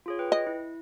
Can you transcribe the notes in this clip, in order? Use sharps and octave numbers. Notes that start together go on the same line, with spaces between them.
F4 G#4 C#5
B4 G5
D#5
E4